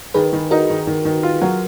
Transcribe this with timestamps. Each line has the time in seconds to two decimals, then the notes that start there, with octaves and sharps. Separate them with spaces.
0.14 D#3 G#4 B4
0.33 D#3
0.51 D#4 F#4 A#4
0.70 D#3
0.87 D#3
1.05 D#3
1.23 F4
1.42 F#3